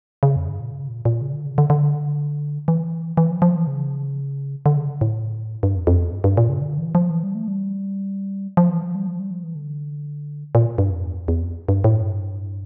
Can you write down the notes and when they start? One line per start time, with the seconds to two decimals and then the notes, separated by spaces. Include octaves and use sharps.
0.23 C#3
0.36 F2
0.47 G2
0.60 A#2
0.72 C#3
0.88 A#2
1.05 A#2
1.22 C#3
1.33 D3
1.46 C#3
1.58 D3
1.70 D3
2.68 E3
3.17 E3
3.31 F3
3.42 F3
3.55 E3
3.67 C#3
4.66 D3
4.77 C#3
5.01 A2
5.63 G2
5.76 F2
5.87 F2
6.01 E2
6.12 G2
6.24 G2
6.37 A#2
6.49 C#3
6.62 D3
6.78 E3
6.95 F3
7.10 E3
7.23 G3
7.35 A3
7.48 G3
8.57 F3
8.69 E3
8.83 F3
8.95 G3
9.07 F3
9.19 G3
9.31 F3
9.44 E3
9.55 D3
10.55 A#2
10.78 G2
10.90 F2
11.04 E2
11.16 F2
11.28 E2
11.41 F2
11.69 G2
11.84 A2
12.01 G2